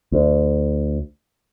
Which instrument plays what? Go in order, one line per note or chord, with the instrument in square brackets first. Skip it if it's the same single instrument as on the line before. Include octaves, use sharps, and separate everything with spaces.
[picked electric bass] D2